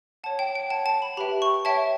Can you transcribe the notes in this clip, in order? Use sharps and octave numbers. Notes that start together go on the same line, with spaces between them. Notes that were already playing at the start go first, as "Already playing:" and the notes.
C#5 F#5 A5
G5
G5
C#5 F#5 A5
A5
B5
G4 B4 E5 G5 B5
C#6
C#5 E5 G5 A5